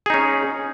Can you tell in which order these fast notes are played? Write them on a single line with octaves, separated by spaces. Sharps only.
G#4 D#4 C#4